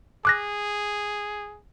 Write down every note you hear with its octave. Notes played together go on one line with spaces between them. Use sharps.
G#4 D6 F#6 A#6